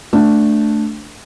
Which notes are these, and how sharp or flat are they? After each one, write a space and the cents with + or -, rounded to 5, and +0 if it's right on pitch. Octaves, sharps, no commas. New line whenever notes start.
A3 +0 D4 +0